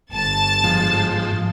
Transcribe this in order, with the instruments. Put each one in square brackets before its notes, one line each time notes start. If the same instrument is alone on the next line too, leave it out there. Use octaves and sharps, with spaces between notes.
[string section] G1 A5 A6
[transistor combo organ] G#2 F3